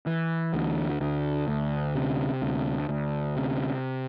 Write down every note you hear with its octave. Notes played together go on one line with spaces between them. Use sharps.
E3
D2
D2
D2
C3
D2
D2
C3